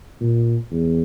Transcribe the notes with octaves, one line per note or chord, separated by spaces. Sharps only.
A#2
E2